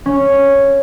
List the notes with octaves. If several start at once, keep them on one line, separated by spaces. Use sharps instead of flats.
C#4